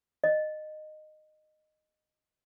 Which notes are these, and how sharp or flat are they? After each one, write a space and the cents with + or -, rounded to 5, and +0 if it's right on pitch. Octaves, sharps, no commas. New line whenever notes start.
D#5 -15